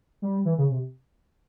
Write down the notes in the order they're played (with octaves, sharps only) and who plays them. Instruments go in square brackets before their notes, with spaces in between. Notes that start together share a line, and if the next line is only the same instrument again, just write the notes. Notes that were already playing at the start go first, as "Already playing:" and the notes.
[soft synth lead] G3
E3
C#3
C3